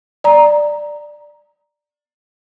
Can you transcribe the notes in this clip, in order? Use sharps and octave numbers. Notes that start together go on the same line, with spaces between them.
D5 A#5